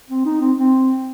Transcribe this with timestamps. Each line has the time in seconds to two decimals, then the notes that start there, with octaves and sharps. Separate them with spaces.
0.10 C4
0.25 D#4
0.41 C4
0.58 C4